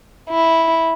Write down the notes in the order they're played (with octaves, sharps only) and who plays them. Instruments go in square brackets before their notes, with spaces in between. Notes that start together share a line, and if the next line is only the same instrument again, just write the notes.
[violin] E4